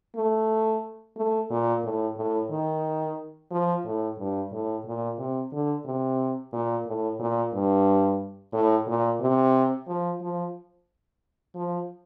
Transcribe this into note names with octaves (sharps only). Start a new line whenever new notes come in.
A3
A3
A#2
A2
A2
D#3
F3
A2
G2
A2
A#2
C3
D3
C3
A#2
A2
A#2
G2
A2
A#2
C3
F3
F3
F3